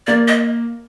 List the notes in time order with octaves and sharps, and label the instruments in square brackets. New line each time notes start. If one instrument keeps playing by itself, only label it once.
[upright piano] A#3 [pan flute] D5
[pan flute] D#5